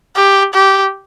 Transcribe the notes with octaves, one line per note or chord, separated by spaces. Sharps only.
G4
G4